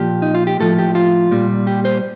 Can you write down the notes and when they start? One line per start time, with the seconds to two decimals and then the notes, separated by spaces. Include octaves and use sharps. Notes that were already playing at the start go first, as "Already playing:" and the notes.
Already playing: A#2 F3 G4
0.22 D#4
0.35 F4
0.47 G4
0.60 A2 F3 A4
0.78 G4
0.95 F4
1.31 A#2 G3
1.67 G4
1.85 C5